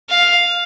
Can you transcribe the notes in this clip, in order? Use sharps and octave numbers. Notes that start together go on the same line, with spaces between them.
F5